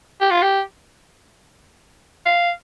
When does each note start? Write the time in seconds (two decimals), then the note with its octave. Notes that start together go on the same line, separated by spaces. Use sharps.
0.21 G4
0.30 F4
0.42 G4
2.25 F5